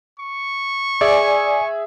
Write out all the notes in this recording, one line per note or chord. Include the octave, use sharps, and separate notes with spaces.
C#6
G#4 D5 E5 G#5